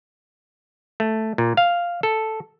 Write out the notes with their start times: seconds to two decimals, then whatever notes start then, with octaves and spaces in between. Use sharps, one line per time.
1.00 A3
1.38 A#2
1.57 F5
2.03 A4